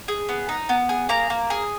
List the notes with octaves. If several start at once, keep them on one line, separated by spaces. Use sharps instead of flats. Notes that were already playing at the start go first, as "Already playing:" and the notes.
G#4
B3
D#4
B3
G#4
A#3 A#5
A#3
G#4